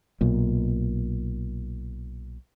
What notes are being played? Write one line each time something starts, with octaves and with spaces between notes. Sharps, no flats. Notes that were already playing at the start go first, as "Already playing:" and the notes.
B1 A#2